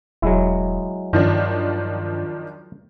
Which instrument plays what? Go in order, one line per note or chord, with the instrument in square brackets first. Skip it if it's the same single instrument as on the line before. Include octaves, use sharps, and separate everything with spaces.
[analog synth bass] E1 [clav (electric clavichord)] F#3 G#3 E4
[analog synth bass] G2 [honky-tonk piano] D#3 F3 D4